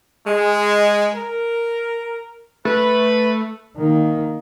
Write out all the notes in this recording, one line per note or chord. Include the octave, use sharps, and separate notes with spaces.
G#3
A#4
A3 B4
D#3 A#3